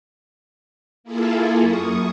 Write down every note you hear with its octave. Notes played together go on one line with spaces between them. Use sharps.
A#3 E4 F4 G#4 A4
F#2 C#6 D#6